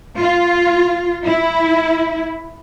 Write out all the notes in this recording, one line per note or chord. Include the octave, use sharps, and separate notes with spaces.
F4
E4